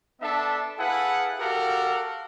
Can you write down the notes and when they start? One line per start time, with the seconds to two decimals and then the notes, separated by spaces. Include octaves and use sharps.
0.21 B3 D4 A4 E5
0.79 E4 G#4 A4 B4 F5 F#5
1.39 F#4 G4 A4 A#4 F5 F#5